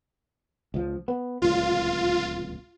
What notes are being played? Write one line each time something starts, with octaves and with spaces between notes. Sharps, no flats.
C#2 F3
B3
D1 C#2 A#2 F4